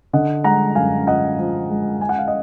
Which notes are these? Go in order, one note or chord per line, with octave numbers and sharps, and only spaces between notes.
D3 D#5 F#5
G#3 F#5 A#5
F#2 F5 G#5
F3 D#5 F#5
F3
G#3
G#3 G#5
F#5
F5
D#5